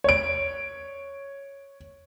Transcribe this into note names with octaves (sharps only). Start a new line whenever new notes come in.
C#5 D7